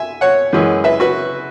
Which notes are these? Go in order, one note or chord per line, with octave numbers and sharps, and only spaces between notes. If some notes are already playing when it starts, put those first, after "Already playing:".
Already playing: E5 G#5
C#5 F#5
F#2 E3 G#3 C#4
B4 E5
F#4 B4